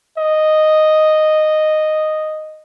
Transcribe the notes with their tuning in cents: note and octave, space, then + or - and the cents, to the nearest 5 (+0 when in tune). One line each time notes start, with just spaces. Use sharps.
D#5 -5